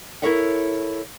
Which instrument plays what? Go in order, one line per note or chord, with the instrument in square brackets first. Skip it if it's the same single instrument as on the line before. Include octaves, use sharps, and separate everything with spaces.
[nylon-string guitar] E4 A4 A#4 C#5 E5 F#5